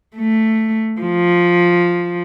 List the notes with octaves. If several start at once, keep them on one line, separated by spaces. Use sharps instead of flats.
A3
F3